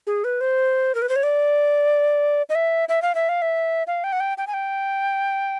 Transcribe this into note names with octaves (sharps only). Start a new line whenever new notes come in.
G#4
B4
C5
A#4
B4
C5
C#5
D5
D#5
E5
E5
F5
E5
F5
E5
F5
G5
F#5
G5
G5
G#5
G5